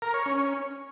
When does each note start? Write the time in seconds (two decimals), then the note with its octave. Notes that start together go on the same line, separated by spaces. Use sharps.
0.02 A#4
0.14 C#5
0.26 C#4